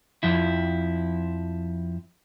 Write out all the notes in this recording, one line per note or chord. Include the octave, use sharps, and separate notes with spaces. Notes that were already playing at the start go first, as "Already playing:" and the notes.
F2 F3 E4